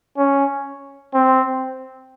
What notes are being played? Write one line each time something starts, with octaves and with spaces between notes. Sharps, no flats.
C#4
C4